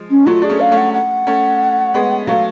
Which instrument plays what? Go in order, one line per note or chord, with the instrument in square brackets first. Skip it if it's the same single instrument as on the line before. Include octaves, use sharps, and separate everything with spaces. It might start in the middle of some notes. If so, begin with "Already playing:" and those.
Already playing: [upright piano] F3 G#3
[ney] C#4
[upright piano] F#3 A3 [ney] F4
[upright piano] D4 [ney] G#4
[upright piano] A3 C#4
[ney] F5
[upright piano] A3 C#4
[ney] F#5
F#5
[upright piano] A3 C#4
G#3 B3
[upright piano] F#3 A3 [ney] F5